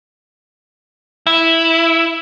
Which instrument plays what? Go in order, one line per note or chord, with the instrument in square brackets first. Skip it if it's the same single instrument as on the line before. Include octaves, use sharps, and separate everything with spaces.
[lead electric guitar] E4